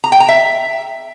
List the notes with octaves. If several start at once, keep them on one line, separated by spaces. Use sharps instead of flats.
A#5
G5
A#5
E5